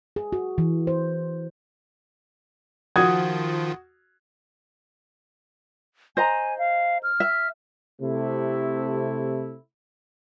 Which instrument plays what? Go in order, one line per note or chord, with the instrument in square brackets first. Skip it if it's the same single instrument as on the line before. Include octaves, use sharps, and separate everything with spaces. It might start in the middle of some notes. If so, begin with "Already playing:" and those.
[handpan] G#4
F#4
E3
C5
[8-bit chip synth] D#3 F3 F4 [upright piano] F#4 D#6 G#6
[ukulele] C5 D#5 A#5 [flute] G#5
[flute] F5
F6
[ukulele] E5
[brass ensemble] C3 A3 E4